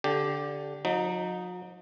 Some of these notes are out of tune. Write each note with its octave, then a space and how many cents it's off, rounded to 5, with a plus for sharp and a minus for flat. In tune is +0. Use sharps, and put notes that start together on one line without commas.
D3 -15 G4 +0
F#3 -45 D#4 +0